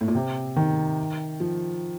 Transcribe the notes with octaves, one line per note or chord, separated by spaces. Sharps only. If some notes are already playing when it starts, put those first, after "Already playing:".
A2
A#2
C3
D#3
F3